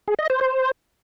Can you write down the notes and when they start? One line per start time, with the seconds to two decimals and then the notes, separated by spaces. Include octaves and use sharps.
0.08 G#4
0.19 D#5
0.30 C5
0.41 C5